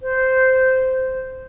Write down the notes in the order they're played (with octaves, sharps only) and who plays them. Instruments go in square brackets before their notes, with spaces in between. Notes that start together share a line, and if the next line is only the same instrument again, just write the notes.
[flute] C5